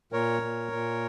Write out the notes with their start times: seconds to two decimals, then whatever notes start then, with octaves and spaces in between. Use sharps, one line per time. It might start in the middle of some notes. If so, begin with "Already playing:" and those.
0.12 A#2 A#4 C#5
0.42 A#2
0.72 A#2